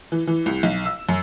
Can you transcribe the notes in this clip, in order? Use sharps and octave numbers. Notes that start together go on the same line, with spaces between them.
E3
E3
C2
B1
E6
F#2